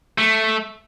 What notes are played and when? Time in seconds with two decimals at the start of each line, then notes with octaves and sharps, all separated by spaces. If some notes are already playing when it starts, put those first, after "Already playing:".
0.18 A3